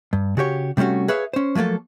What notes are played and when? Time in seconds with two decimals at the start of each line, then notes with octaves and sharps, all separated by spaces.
0.13 G2
0.37 C#3 F#4 G4 C#5
0.77 C3 G3 A3 C#4 F#4
1.08 G#4 B4 C#5 E5 F5
1.33 C#4 C5
1.55 F3 F#3 A3 A#3 A4